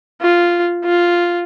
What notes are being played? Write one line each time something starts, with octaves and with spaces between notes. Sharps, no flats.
F4
F4